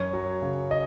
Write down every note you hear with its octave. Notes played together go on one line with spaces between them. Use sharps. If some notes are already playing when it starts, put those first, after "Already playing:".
Already playing: F#2 C#5
F#3
C#3
D#5